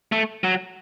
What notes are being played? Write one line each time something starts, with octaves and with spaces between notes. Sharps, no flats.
A3
F#3